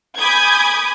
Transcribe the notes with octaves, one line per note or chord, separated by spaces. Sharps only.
G#5 B5 D6 D#6 G6 G#6